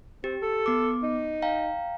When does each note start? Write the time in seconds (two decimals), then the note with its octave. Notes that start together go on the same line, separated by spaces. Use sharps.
0.24 C4 G4
0.42 A4
0.66 B3 D6
1.03 D#4
1.42 F5 G5 A#5